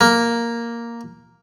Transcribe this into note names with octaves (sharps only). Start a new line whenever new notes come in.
A#3